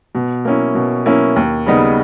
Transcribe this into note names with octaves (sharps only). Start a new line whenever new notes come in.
B2
A#3 C#4 E4
B2
A#3 C#4 E4
D#2
C#3 G3 B3 D#4